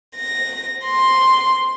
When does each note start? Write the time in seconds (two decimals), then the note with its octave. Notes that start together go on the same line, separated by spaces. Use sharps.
0.16 A#6
0.85 C6